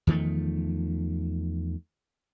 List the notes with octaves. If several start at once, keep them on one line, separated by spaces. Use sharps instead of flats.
E2 D#3 F3 A3